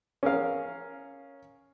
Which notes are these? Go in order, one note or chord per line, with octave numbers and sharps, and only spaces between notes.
C#4 G#4 A#4 F5